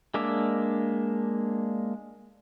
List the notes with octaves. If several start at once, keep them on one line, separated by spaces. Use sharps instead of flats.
G#3 A#3 D4 E5 D6